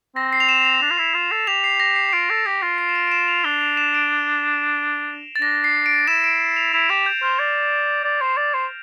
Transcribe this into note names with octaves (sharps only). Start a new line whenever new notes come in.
C4 A#6
C7
F7
E7
F7
D4
F4
E4
F4
A4
G4 F7
C7
A#6
C7
C7
F4 D7
A4
G4 A#6
F4
C7
E7
D7
D7
E7
F7
D4 G7
F7
E7
D7
A6
D4 A#6
C7
D7
E4 E7
D7
F7
E4 F7
G4 E7
G6
C5 F6
D5
D5
C5
D5
C5